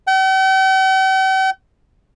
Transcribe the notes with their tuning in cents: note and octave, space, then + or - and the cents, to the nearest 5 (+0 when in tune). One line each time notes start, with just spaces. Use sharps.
G5 -45